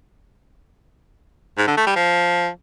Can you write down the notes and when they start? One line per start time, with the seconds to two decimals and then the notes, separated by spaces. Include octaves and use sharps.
1.58 G#2
1.67 D3
1.77 A3
1.86 G3
1.96 F3